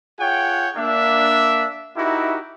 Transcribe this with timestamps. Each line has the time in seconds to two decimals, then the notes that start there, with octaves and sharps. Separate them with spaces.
0.19 F4 G#4 C#5 F#5 G5
0.75 A#3 D4 E5
1.96 D#4 E4 F#4 G4 A#4 E5